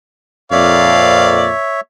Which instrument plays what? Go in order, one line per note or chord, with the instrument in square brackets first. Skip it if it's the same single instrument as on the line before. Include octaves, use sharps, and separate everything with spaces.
[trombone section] F2 A#2 [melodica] C#5 E5 [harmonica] D5 F5